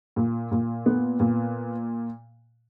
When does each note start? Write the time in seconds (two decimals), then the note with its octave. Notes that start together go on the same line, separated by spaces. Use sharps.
0.16 A#2
0.51 A#2
0.86 B3
1.20 A#2